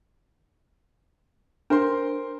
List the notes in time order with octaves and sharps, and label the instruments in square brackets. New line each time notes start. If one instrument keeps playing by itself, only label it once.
[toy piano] D4 [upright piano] A#4 C5 C6